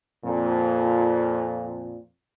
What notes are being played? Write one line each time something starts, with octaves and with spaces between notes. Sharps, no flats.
F2 A#2